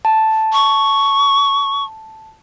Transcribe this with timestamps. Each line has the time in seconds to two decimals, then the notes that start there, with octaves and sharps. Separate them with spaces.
0.05 A5
0.53 C#6